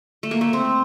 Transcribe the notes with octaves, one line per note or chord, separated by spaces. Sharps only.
A3
A#3
A3
C4